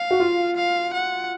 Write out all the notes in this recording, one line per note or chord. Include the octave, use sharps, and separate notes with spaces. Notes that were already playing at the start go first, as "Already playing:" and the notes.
Already playing: F5
F#4
F4
F5
F#5